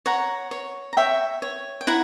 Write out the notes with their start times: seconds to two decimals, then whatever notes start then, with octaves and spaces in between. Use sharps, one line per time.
0.06 C#5 F#5 A#5
0.51 C#5
0.93 A#5
0.97 C#5 E5 G5
1.42 C#5
1.81 G5
1.87 E4 F#5 A#5